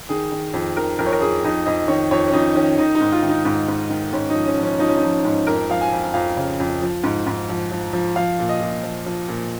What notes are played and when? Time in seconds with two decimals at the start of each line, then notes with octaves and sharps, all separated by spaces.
0.09 D#3 G#4
0.32 D#3
0.53 F2
0.76 D#3 A#4
0.99 F2 A#4
1.06 C#5
1.12 A#4
1.21 F2 G#4
1.44 F2 D#4
1.66 F2 D#5
1.88 D#3 C#5
2.11 F2 C#5
2.28 C#4
2.33 F2 D#4
2.55 D#3 C#4
2.78 D#3 D#4
2.95 D#4
3.01 G#2
3.12 F4
3.22 D#3
3.28 D#4
3.45 G#2
3.68 G#2
3.90 D#3
4.13 G#2 C#4
4.30 F3 D#4
4.46 C#4
4.58 F3
4.63 C#4
4.79 F3 D#4
4.88 C#4
4.97 D#4
5.03 F3
5.25 G#2
5.46 F2 A#4
5.69 F3 F5
5.81 G#5
5.92 F2
6.14 F2 F5
6.37 C#3
6.60 F2
6.82 F3
7.04 G#2
7.27 G#2
7.49 F3
7.71 F3
7.93 F3
8.16 F3 F5
8.39 A#2
8.49 D#5
8.61 A#2
8.83 F3
9.06 F3
9.28 A#2